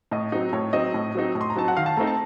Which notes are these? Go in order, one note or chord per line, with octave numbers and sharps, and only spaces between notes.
A2 D#5
F#3 C4 D#4
A2 C#5
F#3 C4 D#4 D#5
A2
F#3 C4 D#4
A2
C6
A#5
F#3 C4 D#4 A5
F#5
D#3 F5
A5
A3 C4 D#4 A#5
A5